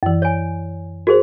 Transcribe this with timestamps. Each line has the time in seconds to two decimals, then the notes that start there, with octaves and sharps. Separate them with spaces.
0.03 F#2 E3
0.22 C#5 G#5
1.07 F#4 G#4 A#4 C5